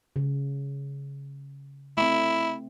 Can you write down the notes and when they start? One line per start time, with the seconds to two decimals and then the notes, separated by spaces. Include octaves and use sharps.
0.16 C#3
1.97 A3 C4 E4